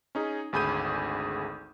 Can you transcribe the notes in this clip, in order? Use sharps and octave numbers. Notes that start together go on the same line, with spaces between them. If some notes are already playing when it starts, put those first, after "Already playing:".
C#4 D#4 G#4
G#1 D2 G#4 B5 G6 D#7